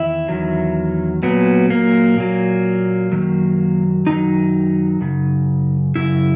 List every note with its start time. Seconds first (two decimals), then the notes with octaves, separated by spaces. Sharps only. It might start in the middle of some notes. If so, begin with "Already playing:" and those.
Already playing: E2 D#3 E4
0.29 E2 D#3 F#3
1.23 A#2 F#3 B3
1.70 A#3
2.18 A#2 F#3
3.12 F#2 D#3 F#3
4.07 F#2 D#3 F#3 D#4
5.01 F#2 C#3
5.96 F#2 C#3 E4